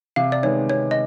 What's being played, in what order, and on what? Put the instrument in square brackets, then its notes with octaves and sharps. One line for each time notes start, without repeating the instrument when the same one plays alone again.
[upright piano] C3 [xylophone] F5
[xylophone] D5
[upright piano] D#3 G#3 B3 D#4 [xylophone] C#5
[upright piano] C3 [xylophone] C#5
[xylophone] D#5